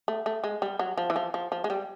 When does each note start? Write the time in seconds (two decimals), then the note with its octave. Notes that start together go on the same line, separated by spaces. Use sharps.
0.08 A3
0.26 A3
0.44 G#3
0.62 G3
0.79 F#3
0.98 F3
1.10 E3
1.16 F3
1.34 F3
1.52 F3
1.64 G#3
1.70 G3